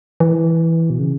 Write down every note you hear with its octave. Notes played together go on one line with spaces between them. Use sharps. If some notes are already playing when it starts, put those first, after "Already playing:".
E3
B2
C#3